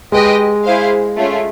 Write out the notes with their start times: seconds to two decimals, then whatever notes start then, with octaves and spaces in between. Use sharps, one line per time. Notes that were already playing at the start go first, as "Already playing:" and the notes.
0.12 G#3 G4 B4 D#5 G5
0.64 E4 G#4 C5 F5
1.17 A3 C#4 F4